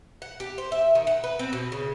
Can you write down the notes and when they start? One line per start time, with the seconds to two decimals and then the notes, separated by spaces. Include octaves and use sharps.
0.22 F#5
0.40 G4
0.58 C5
0.72 E5
0.95 D#3
1.07 F#5
1.24 B4
1.39 C4
1.53 B2
1.72 C#3